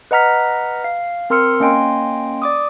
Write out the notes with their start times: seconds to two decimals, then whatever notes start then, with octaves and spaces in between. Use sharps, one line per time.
0.11 B4 D#5 F#5 A#5 F6 B6
0.84 F5
1.30 C4 A#4 C6 E6 F6 C#7
1.60 A#3 C#4 D#5 G5 G#5 C6
2.42 D5 D6 D#6